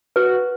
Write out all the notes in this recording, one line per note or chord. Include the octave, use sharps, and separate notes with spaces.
F#4 B4